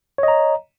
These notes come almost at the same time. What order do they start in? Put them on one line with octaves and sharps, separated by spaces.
C#5 D#5 A#5